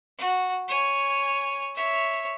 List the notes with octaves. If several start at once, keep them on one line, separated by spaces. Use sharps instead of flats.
F#4
C#5 G#5
C#5 E5